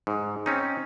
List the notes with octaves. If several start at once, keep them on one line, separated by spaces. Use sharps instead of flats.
G#2
C4 C#4 D#4